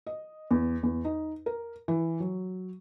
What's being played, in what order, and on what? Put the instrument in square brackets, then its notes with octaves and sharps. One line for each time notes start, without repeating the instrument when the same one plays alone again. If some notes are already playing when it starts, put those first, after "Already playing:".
[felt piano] D#5
E2
E2
D#4
A#4
E3
F#3